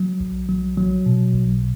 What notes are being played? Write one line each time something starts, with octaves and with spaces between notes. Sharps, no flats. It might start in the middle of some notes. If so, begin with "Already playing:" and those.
Already playing: F#3
B1
F#3
F#3
B2
B1